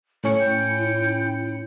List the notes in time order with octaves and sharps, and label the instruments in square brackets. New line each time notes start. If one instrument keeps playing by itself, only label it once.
[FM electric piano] A2 C#4 C#7 [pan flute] E4
[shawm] G5